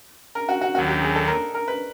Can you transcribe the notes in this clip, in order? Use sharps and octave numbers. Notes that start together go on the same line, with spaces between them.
A#4
F#4
F#4
D#2 D#3 F#3 F#4
G4
G#4
A4
A#4
A#4
B4